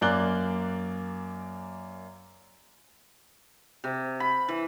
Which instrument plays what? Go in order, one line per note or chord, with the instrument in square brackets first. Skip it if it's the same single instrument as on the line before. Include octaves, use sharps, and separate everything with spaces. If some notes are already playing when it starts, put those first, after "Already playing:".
[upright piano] F#2 A#3 D5 F#6 G7
[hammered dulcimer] C3
B5
E3